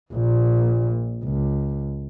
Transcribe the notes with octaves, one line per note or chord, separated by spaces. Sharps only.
A#1 A#2
C#2